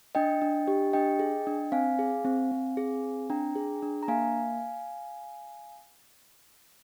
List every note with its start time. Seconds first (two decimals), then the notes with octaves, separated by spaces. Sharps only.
0.15 D4 D#5 G5
0.42 D4
0.67 G4
0.93 D4 D#5 G5
1.19 G#4
1.47 D4
1.72 C4 F5 G#5
1.99 G#4
2.25 C4
2.51 C4
2.77 G#4
3.03 C4
3.30 D4 G5 A#5
3.56 G#4
3.83 D4
4.03 A#5
4.08 A#3 F5 G#5